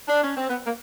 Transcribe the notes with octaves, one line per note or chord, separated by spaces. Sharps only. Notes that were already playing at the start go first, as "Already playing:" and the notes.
D4
C#4
C4
B3
A#3